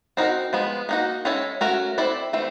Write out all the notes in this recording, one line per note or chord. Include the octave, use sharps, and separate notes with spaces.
C4 D#4 F#4 A#4
F3 G#3 B3
A#3 D#4 F#4
G#3 C#4 E4 A4 C#5
A3 C#4 F#4 A#4
C4 E4 A4 D5
E3 A3 C4